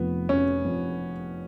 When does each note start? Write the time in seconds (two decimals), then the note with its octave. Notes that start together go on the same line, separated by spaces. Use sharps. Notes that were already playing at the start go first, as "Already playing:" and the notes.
Already playing: F1 F3 B3
0.29 F1 C#4
0.65 F2